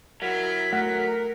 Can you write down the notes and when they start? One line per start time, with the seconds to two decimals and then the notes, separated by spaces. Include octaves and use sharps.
0.22 F#3 E4 F#4 A#4 B6
0.73 A3 A#4 F#5